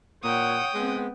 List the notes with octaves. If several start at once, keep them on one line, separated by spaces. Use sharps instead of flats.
A#2 C#5 F#5 G5 D#6
G#3 B3 C4